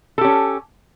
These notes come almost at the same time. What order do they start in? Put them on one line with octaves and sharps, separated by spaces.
A4 G4 C#4